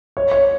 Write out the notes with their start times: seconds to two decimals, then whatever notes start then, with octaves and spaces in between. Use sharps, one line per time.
0.17 C#5
0.31 C#5